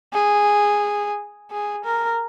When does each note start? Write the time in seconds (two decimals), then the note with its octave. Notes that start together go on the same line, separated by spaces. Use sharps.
0.13 G#4
1.51 G#4
1.85 A#4